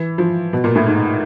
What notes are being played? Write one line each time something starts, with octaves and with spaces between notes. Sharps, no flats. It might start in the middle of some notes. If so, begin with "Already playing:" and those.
Already playing: E3
F3
B2
A#2
A2
G#2